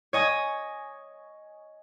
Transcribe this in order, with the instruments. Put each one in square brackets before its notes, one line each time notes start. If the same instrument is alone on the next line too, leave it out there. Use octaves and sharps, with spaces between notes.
[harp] C#5 D#5 G#5 D#6